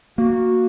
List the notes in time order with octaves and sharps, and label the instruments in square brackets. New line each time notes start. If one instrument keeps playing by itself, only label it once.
[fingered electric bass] A#3 [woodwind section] F#4